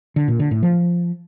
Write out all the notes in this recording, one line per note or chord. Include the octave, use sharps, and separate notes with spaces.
D3
A#2
D3
A2
F3